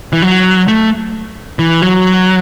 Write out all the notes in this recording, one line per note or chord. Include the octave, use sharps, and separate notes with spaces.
E3
F#3
A3
E3
F#3